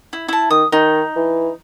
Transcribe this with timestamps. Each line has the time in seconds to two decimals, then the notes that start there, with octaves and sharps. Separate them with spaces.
0.13 E4
0.28 E4 A5
0.51 D#3 D#6
0.72 D#3 D#4
1.16 E3